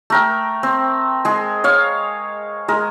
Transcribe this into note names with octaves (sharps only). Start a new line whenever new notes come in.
A3 A#4 G5
C4
G#3 G#4
C#5 F5
G#3 A#4